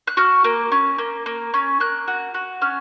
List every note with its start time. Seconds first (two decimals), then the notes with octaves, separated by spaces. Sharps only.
0.07 F#6
0.17 F#4 F6
0.44 A#3
0.72 C#4
0.98 A#3
1.26 A#3
1.54 C#4
1.80 A#3 F#6
2.08 F#4
2.34 F#4
2.61 C#4 F6